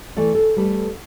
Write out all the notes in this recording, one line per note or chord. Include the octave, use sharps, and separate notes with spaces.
E3 A3 E4 D5
A4
G3 A3 B4